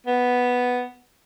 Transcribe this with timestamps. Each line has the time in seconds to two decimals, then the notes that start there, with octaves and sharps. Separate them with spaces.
0.07 B3